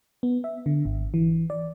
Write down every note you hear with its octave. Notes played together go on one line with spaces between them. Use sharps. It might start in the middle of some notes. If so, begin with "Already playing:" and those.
B3
E5
D3
G#1
E3
D5